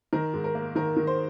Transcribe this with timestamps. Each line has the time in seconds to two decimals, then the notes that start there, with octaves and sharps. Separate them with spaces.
0.13 D#3 A#4
0.34 G#2
0.44 A#4
0.55 A#3
0.76 D#3 A#4
0.97 D#3
1.07 C5